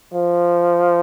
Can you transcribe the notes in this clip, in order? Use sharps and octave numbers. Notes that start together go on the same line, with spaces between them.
F3